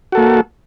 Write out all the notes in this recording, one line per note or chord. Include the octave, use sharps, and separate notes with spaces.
A#3 F#4 A4